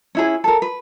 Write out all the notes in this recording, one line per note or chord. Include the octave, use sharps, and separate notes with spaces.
C#4 E4 G#4
A4 A#4
B4